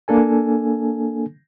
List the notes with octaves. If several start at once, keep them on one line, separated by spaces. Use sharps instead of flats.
A#3 D4 A4 G#5